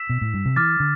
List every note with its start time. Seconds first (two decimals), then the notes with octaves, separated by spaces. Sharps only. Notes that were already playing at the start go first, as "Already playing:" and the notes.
Already playing: E6 B6 E7
0.09 B2
0.21 A2
0.34 G2
0.45 C3
0.56 E3 D6 F6 A6
0.80 D3